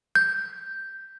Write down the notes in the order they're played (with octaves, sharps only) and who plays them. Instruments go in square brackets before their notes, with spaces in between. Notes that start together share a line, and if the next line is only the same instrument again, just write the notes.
[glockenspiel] G6